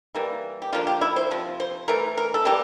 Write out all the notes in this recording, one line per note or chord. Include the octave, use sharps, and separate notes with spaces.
E3 G3 A#3
G4
D3 F3 A#3 F4
G4
E4
C5
C3 F3
C5
E3 A3 A#4
A#4
A4
E3 G3 A#3 G4